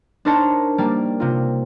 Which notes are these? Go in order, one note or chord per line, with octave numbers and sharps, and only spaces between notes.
D4 D#4 A#4 C5 C#5 A5
G3 A#3 D5
C3 F4